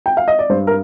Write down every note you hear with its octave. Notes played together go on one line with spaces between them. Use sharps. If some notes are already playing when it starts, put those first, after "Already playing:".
G5
F5
D#5
D5
G2 C5
A#4